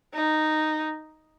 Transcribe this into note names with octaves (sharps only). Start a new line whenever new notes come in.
D#4